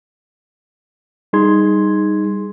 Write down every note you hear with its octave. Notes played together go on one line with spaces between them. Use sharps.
G3 D#4 G#4 C6 G#6